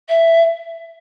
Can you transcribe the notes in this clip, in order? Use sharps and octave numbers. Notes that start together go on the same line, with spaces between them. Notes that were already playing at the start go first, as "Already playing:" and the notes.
E5